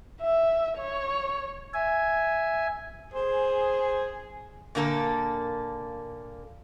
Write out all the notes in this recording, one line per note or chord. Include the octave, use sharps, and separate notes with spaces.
E5
C#5
E5 G#5
G#4 C5
A#2 D3 A#3 A4